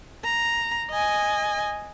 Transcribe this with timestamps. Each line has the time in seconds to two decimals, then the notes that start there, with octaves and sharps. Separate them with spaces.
0.24 A#5
0.90 D#5 G#5